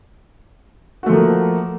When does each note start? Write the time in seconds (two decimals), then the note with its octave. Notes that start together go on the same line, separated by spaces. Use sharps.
1.03 F#4
1.06 A3
1.10 F3
1.13 A#3